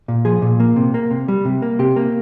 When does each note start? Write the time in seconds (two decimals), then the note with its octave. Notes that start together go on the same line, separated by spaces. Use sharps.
0.08 A#2
0.25 F3 G#4
0.42 A#2
0.60 A#3
0.76 C3
0.94 A#3
1.11 C3
1.28 G3
1.45 C3
1.62 A#3
1.79 C3 G4
1.96 A#3